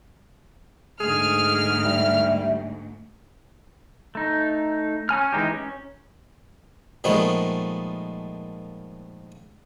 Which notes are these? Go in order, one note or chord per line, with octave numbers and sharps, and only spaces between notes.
D2 G#2 G#4 F6
G3 E5
A3 D#4
C#4 G#5 F6
E3 G#3 D#4 G4
C#4
A#2 D#3 F3 G#3 A3 B3